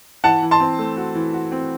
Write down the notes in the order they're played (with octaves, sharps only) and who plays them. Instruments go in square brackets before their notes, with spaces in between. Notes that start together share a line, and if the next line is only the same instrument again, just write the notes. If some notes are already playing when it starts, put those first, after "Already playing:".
[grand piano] E3 [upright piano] F#5 A5
[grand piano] E3
[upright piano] A5 C6
[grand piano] C4
A3
F#4
E3
F#4
C4